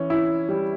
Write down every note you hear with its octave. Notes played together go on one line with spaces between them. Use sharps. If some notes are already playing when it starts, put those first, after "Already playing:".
Already playing: E3 C#4
E4
G3